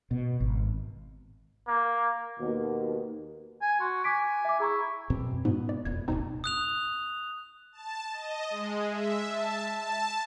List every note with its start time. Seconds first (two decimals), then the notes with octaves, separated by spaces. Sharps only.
0.11 B2
0.40 G#1
1.68 A#3
2.38 D#2 B2
3.62 G#5
3.80 F#4 C6
4.04 G#5 D6 B6 D7
4.45 E5 D6
4.60 E4 G#4 A#5 C#6
5.10 F#2 B2 C4
5.45 G#2 B2 B3
5.69 D5
5.85 E1 F2 B3 G#6
6.08 D1 G#1 B2 C4 D#4
6.44 D#6 F#6 F7
7.72 A5
8.13 D#5
8.50 G#3
8.89 E5
9.30 A5
9.78 A5